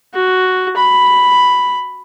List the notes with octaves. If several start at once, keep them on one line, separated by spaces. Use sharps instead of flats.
F#4
B5